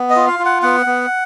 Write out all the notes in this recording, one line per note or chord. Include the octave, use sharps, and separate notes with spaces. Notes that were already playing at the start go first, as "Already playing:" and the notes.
Already playing: B3
D#5
F4
F5
F4
F#5
B3 F#5
B3